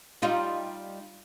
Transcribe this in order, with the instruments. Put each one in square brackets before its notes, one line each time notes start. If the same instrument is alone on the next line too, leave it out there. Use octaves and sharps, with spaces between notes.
[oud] G3 D#4 F4